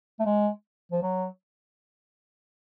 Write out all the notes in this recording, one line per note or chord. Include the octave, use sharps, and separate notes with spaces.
A3
G#3
F3
F#3